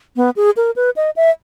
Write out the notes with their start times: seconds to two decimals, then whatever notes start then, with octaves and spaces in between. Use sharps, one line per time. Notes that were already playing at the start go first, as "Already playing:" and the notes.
0.16 B3
0.36 G#4
0.57 A#4
0.76 B4
0.96 D#5
1.16 E5